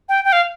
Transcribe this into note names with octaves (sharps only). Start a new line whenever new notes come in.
G5
G5
F5